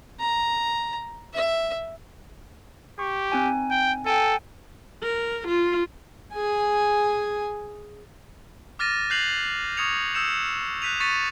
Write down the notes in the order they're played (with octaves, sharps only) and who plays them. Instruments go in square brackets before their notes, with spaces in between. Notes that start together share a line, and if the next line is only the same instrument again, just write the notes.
[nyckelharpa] A#5
E5
[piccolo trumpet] G4 [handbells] C#6
[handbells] C4 D#4 G#5
[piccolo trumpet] G5
[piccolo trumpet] A4 [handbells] G5 G#5
[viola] A#4
F4
[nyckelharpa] G#4 G#5
[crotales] D6 F6 A6 A#6 D#7
F#6 G6 C7 F7 F#7
C#6 D#6 G#6 C#7 F7
D#6 E6 G6 C#7 E7
F#6 G6 B6 D#7 F7
C#6 A6 B6 C#7 D#7